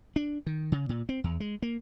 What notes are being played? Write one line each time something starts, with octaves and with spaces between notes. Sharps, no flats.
D4
D#3
C#3
A#2
C4
E2
G#3
A#3